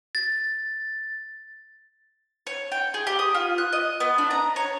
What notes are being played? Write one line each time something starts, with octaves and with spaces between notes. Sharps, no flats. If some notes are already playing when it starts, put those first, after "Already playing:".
A6
C#5
G5
G#4
G4
D#6
F4
F#6
D#5
B3
D4
A#5
C#5